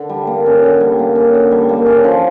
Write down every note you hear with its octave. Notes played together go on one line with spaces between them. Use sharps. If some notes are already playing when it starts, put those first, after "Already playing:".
Already playing: D3
G3
A#3
C#4
D3
G3
A#3
C#4
D3
G3
A#3
C#4
F3